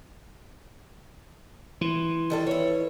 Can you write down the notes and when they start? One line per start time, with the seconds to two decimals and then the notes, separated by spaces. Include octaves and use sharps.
1.81 E3 C6
2.30 D#3 G3 A4
2.47 E4 B4 C#5